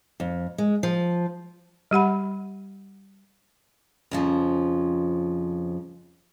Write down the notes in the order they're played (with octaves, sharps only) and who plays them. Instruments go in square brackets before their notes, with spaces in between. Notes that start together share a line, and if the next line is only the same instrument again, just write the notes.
[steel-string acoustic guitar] F2
G#3
F3
[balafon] G3 G4 F#5 B5
[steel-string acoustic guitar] F2 C#3 F3